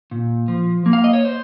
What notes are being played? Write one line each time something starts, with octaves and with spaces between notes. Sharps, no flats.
A#2
F3
A#3
F5
D#5
C#5
C5